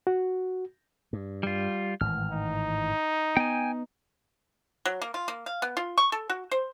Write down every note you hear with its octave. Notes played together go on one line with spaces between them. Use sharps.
F#4
G2
G3 F4
G#1 A2 E3 F6
D#4
B3 G5 G#5
F#3
A#3
F4
A#3
F5
B3
F4
C#6
A4
F#4
C5